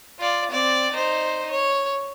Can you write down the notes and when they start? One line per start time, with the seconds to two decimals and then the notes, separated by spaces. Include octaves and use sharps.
0.19 F4 D5
0.51 C4 D5
0.92 D#4 C5
1.51 C#5